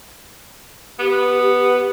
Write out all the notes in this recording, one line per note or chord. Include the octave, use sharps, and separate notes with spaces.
B3 G4